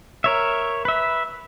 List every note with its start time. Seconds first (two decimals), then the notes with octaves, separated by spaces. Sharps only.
0.24 A#4 C#5 E5
0.85 B4 E5